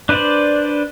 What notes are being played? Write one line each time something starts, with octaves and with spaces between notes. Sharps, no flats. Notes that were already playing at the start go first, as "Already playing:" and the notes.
D4 B4 C5 D5